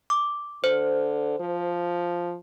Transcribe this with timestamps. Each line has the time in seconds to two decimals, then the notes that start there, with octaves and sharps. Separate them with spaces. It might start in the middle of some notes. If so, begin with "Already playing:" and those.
0.10 D6
0.64 D3 C5
1.39 F3